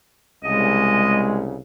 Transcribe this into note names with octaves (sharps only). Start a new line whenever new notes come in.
C2 C#3 G#3 D#5